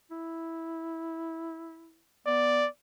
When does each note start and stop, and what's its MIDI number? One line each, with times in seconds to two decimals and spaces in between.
0.11 2.01 64
2.27 2.65 59
2.27 2.67 74